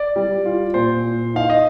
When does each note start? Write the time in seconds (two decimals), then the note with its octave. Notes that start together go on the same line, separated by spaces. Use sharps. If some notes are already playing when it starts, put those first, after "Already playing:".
Already playing: D5
0.16 G3
0.45 F4
0.74 A#2 C5
1.04 A#2
1.34 D#4 F5
1.50 D#5